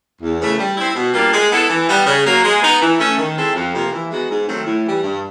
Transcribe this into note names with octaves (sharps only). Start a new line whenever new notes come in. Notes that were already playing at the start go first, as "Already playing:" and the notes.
E2
C#3 E3 A3
G3
C4 E4
B2
G3 A#3 D4 F4
G#3
B3 E4 A4
E3
G3 B3
C#3
F#3 A#3
G#3
B3 D#4
E3
A3 C#4
D#3
G#3 C4 E4 A4
F2
C3 F3 A#3
E3
G#3 B3 D#4 F#4
G#2
D#3 F#3 A3 C4
A2
E3 G3
G2